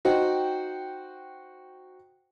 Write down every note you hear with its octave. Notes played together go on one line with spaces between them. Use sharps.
D#4 F#4 C5 F#5 G5